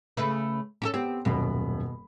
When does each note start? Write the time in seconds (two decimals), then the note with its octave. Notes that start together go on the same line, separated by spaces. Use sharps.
0.17 C#3 A3 B4
0.82 C#4 F#4 A4
0.94 B3 C4 G4
1.25 D#1 F#2 B2 B5